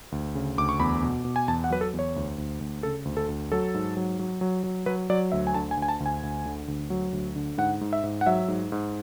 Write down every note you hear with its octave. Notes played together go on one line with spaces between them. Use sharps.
D2
C#3
D2 D6
C#6
E2 B5
B2
B2
G#5
E2 A5
F#5
F#3 B4
A4
E2
C#5
D2
D2
D2
C#3 A4
D2
A4
D2
F#3 A4
G#2
F#3
F#3
F#3
F#3
F#3 B4
F#3 D5
D2 E5
G#5
D3 A5
G#5
D2
G#5
A5
D2
G#5
D2
D3
D2
F#3
D2
D3
G#2 F#5
G#2
E5
G#2
F#5
F#3 E5
G#2
G#2